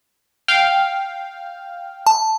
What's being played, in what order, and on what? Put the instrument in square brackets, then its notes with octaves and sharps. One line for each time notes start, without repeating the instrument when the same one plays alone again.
[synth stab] F5 G5
[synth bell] A5